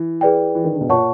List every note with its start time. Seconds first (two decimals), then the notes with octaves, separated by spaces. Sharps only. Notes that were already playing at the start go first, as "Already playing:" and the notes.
Already playing: E3
0.21 G#4 B4 D5 G5
0.55 E3
0.64 D#3
0.73 D3
0.81 B2
0.89 A#2 C#5 F#5 A5 C#6